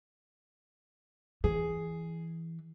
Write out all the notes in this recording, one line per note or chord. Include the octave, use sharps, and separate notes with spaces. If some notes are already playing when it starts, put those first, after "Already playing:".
E3 G#4